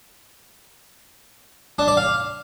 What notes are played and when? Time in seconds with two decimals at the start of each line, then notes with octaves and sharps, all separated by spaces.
1.79 D4
1.88 D5
1.97 F5